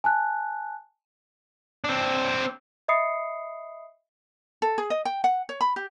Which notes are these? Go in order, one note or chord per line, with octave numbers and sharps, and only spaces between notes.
G#5 A5 F#6
C4 D4
D#5 E5 B5 D#6 C7 C#7
A4
G#4
D#5
G5
F#5
C#5
B5
G4